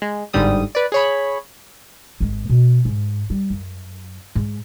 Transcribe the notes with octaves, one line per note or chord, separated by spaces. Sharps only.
G#3
G1 G#2 D3 G3 D#6
B4 D5
G#4 C#5 B5
G#1 G#3
B2 D4
G#2
G3
F#2
G#2